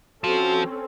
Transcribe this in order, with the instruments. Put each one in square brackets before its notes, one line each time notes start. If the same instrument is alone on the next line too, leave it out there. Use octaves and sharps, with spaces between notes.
[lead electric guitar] F3 [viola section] C4 C#4 A4 [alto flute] F#4